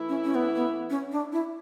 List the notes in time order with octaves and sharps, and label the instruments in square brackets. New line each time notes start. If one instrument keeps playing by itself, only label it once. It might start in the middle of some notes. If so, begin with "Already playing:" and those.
Already playing: [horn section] E3 A3 E4
[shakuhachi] C#4
C#4
B3
B3
C#4
D4
E4